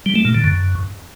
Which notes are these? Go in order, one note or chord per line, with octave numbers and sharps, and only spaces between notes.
G3
A3
A#2
D3
F#2